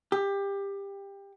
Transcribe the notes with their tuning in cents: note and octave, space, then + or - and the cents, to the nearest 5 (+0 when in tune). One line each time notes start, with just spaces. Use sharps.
G4 +20